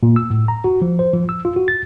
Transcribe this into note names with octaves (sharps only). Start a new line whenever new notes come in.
A#2
E6
A2
A#5
F#4
F3
C5
F3
E6
F4
F#4
A6